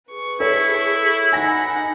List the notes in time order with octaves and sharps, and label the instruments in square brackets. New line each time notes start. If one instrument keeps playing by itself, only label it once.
[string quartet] G#4 B4 C#6
[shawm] E4 [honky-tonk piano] A4 C#5
[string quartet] D#4 F#5 B5 [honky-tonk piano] G#5 A#6